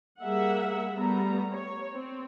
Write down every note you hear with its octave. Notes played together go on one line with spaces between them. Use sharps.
G3 A#3 G#4 E5 F#5
G3 A3 B3 A#5
C#5
C4